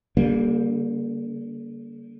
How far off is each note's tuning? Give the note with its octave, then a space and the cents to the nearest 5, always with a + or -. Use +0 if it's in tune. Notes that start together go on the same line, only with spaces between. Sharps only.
D3 -45 G3 +0 A#3 +0